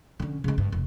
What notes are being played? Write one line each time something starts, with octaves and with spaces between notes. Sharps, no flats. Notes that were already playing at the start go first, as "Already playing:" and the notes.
D3 C#4
C#3 G#3
G2
F1